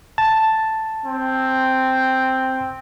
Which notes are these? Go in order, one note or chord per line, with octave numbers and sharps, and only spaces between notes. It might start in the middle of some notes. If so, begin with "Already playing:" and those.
A5
C4